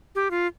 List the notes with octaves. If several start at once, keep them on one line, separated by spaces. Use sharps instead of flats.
G4
F4